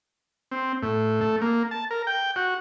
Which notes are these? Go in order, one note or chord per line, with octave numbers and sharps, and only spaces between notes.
C4
A2
A3
A#3
A5
A#4
G5
F#4